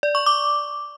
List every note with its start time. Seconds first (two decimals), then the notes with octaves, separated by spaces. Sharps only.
0.03 D5
0.15 C#6
0.26 D6